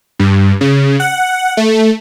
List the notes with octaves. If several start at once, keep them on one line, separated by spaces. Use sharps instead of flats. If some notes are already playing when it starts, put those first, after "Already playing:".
G2
C#3
F#5
A3